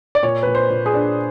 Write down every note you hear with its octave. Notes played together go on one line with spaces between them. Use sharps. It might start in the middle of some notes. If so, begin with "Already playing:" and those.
D5
A#2 C#5
A#2 B4
C5
A#2
G#4
D4